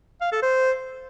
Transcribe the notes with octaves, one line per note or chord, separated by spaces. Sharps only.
F5
A4
C5